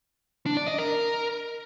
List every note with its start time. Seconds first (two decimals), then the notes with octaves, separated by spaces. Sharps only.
0.46 D4
0.57 D5
0.68 D#5
0.78 A#4